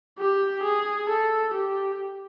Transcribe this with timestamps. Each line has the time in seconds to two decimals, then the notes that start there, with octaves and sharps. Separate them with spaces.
0.19 G4
0.63 G#4
1.10 A4
1.54 G4